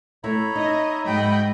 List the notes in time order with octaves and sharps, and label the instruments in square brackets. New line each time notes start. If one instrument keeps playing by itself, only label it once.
[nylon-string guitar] A3 E4 [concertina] C#5 A#5 B5
[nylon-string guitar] D#4 [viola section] D#5 E5
[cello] G#2 [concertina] F#4 E5 C#6 [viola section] D#5 G5 B5